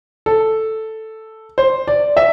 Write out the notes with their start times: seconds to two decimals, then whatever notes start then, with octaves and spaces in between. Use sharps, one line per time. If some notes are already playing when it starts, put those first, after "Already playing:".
0.26 A4
1.58 C5
1.88 D5
2.17 E5